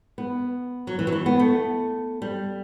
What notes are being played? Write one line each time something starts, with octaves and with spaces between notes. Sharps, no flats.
B3
F#3
E3
F#3
E3
B3
A3
G3